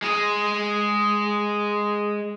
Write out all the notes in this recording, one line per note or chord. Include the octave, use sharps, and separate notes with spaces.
G#3 G#4